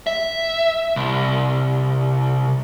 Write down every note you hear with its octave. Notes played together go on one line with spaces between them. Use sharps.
E5
C2